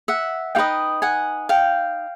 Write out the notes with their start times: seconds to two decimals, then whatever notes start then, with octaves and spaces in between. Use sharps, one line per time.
0.08 E5 F#5
0.55 D#4 G4 B4 D#5 F5 G5
1.02 F#5 G#5
1.49 F5 G5